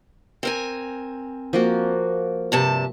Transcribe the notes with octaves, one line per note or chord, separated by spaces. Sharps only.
C4 A#4 G#5
F3 A#3 F#4
G2 C3 A5